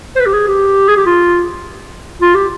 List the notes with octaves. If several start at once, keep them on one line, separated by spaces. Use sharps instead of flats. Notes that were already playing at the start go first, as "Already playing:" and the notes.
C5
B4
G4
G#4
G4
G#4
G4
F4
F4
G4